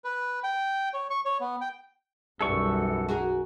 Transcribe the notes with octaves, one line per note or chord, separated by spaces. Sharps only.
B4
G5
C#5
C#6
C#5
B3
G5
B1 F#2 E3 G3 A4 C#6
F#4 G#4 A#4